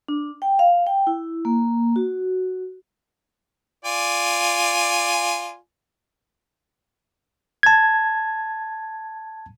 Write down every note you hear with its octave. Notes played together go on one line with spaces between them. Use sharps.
D4
G5
F5
G5
E4
A#3
F#4
F4 D5 G#5
A5 G#6